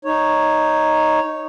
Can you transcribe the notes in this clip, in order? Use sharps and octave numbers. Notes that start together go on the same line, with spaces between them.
D#4 C#5